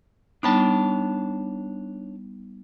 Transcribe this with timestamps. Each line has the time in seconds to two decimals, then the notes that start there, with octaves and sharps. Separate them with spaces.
0.43 G3 B3 D4 D#4 C#5 A5